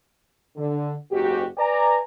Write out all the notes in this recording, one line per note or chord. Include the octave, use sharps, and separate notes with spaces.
D3
F#1 G#2 F#4 G4
B4 D5 G#5 A#5